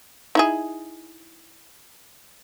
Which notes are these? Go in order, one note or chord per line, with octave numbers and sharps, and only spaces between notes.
D#4 E4 G#4